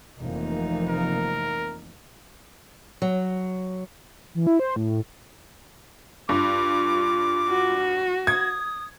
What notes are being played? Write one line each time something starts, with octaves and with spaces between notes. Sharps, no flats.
F1 E3 F3 A#3 D#4
A#4
F#3
E3
E4
C5
A2
G2 F4 D6
F#4
D#6 G#6